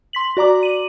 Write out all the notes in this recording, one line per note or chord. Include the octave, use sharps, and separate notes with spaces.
C6 B6 F#7
F#4 D5 A#5 D6
D#7 F#7